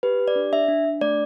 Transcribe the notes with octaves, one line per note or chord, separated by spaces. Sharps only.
G4 B4
G4
D5
D4
D4 E5
D4
D4
A3 D5